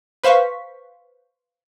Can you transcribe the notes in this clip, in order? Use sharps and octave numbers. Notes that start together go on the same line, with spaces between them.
B4 C5 F5 C#6 B6